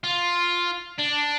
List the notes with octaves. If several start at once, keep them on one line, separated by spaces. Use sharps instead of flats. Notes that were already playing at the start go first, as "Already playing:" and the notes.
F4
D4